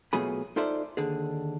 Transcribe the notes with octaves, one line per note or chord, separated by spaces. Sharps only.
B2 F#3 A3 F4 G#4 B5
D#4 F4 A4 C5 D5 E5
D#2 D3 G#4